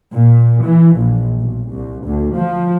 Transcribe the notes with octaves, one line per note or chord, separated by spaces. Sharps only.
A#2
E3
A#1
B1
C2
D2
F3